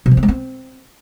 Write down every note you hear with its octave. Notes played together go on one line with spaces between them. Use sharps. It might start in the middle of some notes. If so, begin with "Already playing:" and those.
B2
F3
C4
G#3
C4